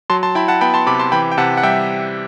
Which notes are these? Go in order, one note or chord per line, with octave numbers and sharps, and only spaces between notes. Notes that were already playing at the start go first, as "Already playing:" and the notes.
F#3 A5 C6
A5 C6
E4 G5 B5
F#5 A5
B3 G5 B5
A5 C6
C3 B5 D6
A5 C6
E3 G5 B5
G5
C3 F#5 A5
F#5
G3 E5 G5